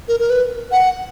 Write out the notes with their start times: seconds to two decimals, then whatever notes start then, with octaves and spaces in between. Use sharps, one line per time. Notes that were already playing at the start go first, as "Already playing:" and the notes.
0.08 A#4
0.19 A#4
0.30 B4
0.72 F#5